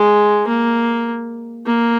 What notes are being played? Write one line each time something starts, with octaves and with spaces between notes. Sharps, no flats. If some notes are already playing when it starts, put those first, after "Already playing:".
Already playing: G#3
A#3
A#3